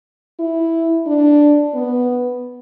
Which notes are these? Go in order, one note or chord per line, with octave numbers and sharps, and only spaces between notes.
E4
D4
B3